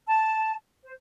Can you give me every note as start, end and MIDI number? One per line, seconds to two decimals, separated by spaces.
0.06 0.55 81
0.83 0.92 72